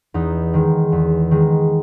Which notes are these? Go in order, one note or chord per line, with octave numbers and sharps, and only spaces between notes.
E2 D#4
D#3 G#3
E2
D#3 G#3